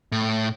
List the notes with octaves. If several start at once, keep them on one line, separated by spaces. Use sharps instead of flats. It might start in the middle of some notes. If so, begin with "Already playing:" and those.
A2